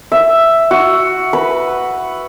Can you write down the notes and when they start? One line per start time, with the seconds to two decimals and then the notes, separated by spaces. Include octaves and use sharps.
0.12 E5
0.71 F#4
1.33 B4